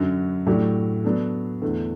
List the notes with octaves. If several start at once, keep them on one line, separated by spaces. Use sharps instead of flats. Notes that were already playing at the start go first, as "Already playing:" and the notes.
Already playing: F#2 D3 F#3
A2 F#3 A3 D4 G4
F#3 B3 D4 A4
E2 D3 A3